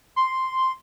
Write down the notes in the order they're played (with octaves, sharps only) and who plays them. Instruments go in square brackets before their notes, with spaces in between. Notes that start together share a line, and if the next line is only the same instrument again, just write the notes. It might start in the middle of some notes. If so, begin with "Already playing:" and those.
[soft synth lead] C6